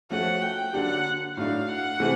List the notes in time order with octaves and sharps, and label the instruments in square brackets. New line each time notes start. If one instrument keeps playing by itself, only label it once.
[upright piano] F3 A3 C#4 F#4 [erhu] F#5
[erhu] G5
[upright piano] D3 F#3 A#3 D4 G4 [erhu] F#5
[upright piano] A2 F#3 A3 D4 [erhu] F5
[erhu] F#5
[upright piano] C3 E3 A3 C4